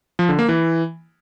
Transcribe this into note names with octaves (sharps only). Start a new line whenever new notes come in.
F3
D3
A#3
E3